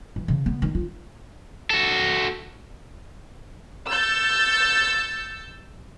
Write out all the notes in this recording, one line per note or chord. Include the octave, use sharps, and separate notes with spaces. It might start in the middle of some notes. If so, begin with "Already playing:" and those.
E3
C#3
B3
D#3
F4
F#4 A4
E6 G6 A6 C#7